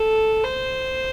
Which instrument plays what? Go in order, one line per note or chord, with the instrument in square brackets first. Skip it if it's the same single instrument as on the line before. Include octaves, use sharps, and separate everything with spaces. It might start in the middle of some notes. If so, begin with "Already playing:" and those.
Already playing: [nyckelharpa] A4
C5